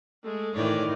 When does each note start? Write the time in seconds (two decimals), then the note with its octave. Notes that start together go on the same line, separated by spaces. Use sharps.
0.23 G#3 A3
0.55 A2 D#3 E3 C#5 D5